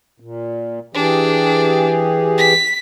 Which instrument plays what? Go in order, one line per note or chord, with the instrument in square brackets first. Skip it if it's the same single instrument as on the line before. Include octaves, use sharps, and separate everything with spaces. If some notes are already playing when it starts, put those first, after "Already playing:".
[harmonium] A#2
[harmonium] E3 G4 G#4 [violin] D4
[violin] B6